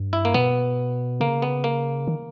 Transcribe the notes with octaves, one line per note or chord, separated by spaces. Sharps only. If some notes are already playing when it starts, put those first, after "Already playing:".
Already playing: G2
E4
A#3
B2 B3
C#3 A#3
B3
A#3
D#3